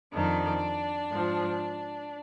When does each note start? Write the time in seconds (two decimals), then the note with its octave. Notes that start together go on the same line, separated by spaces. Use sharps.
0.13 F2 D#3 D4
1.09 G#2 F3